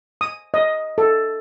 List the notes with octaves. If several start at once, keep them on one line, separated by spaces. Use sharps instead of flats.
D#6
D#5
A4